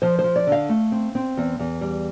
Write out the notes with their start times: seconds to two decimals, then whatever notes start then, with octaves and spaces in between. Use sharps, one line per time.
0.02 F3 C5
0.19 C5
0.24 F3
0.36 D5
0.47 D3
0.52 F5
0.69 A3
0.92 C4
1.15 C4
1.37 E2
1.59 E2
1.81 G3